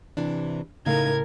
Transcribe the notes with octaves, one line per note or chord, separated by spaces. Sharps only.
C3 E3 D4
A2 C#3 A3 D#4 A#4 F5 G#6